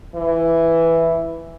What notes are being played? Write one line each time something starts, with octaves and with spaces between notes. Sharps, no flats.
E3